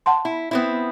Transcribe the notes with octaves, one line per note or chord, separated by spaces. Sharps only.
F#5 A5 C6
E4
B3 C4 E4